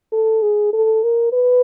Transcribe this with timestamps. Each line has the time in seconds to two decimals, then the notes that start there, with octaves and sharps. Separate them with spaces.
0.12 A4
0.42 G#4
0.73 A4
1.04 A#4
1.33 B4